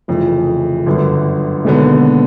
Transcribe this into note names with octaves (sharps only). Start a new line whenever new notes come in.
F1 F2 C#3 E3
G1 F#2 D3
E1 D#2 D3 F#3 B3